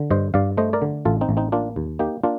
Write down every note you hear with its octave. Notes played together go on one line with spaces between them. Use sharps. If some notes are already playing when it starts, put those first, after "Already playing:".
Already playing: D3
G2 C5 D#5
G2 D5 F5
A3 C5 D#5
A#4 D5
D3
A1 F4 A4
C4 D#4
A1
C4 D#4
A#3 D4 F4
D#2
A#3 D#4 G4
A#3 D4 F4